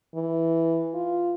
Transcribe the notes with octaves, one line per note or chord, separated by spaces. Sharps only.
E3
F4